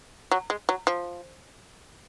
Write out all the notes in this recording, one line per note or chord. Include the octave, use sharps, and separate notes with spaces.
F#3
G#3
F#3
F3